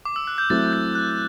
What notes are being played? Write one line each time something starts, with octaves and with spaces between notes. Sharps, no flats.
D6
E6
F#6
G6
F#3 A3 C4 E4 A6
G6
F#6